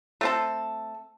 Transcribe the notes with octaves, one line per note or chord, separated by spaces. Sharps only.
A3 C4 A4